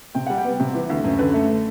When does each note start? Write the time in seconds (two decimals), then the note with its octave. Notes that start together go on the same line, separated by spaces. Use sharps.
0.15 C3 G5
0.27 G3 F#5
0.38 G5
0.45 B3
0.60 C3
0.74 E3
0.90 D2
1.04 F#2
1.19 D3 B4
1.34 A3